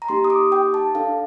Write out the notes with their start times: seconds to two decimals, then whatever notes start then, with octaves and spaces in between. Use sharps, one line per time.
0.02 A#5
0.09 A#3 D#4 G4 C6
0.24 D#6
0.30 D6
0.52 G5
0.74 A5
0.95 D4 A4 F5